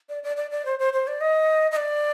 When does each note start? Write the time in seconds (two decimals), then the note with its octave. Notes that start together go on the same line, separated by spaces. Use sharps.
0.09 D5
0.23 D5
0.37 D5
0.51 D5
0.66 C5
0.79 C5
0.93 C5
1.08 D5
1.21 D#5
1.71 D#5
1.77 D5